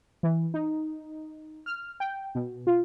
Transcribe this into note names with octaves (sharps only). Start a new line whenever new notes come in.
E3
D#4
F6
G5
B2
F4